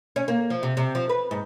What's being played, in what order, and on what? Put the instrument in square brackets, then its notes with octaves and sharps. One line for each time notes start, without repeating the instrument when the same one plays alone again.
[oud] C#4
A#3
F3
C3
C3
F3
B4
G#2